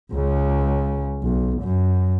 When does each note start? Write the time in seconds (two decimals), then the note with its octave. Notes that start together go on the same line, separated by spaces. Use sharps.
0.11 C#2 C#3
1.23 B1
1.62 F#2